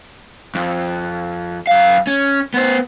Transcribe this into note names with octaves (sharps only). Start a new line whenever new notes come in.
F2
F#2 F5
C#4
B3 C5